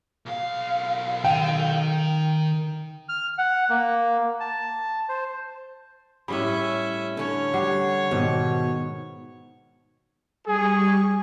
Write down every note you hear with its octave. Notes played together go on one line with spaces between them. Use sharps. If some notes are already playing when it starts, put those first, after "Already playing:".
B1 F5
D#3 G5
F6
F#5
A#3
A5
C5
A2 G3 C#4 G#4 E5 B5
D3 C#4 C#5
G3 F#5
G#2 B2 D#3
G3 G#4 C#6